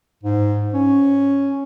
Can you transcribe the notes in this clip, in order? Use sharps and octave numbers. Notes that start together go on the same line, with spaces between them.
G#2
C#4